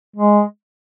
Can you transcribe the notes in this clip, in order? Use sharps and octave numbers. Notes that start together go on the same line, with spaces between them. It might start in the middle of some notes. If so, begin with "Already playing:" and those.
G#3